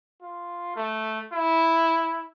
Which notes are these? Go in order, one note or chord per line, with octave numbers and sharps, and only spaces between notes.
F4
A3
E4